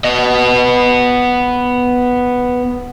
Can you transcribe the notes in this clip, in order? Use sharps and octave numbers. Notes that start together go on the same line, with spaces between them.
B3 D#5